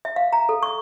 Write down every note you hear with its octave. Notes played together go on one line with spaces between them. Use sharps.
E5
F5
A#5
A4
C#6